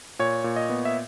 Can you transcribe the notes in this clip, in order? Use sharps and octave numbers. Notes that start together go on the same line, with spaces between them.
A#2 C#5
A#2
D#5
B3
E5